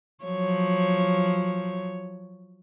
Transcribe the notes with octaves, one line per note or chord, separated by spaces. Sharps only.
F3 F#3 C#5